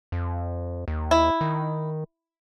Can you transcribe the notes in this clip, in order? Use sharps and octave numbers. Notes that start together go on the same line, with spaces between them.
F2
D#2
E4
D#3